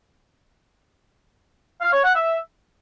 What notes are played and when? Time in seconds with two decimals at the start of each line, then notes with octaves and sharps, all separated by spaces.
1.82 F5
1.93 C#5
2.04 F#5
2.15 E5